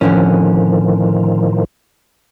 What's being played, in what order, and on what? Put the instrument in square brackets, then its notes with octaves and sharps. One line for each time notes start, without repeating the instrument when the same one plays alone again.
[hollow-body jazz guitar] F2 D3 C#4 [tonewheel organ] A2 D#3 F3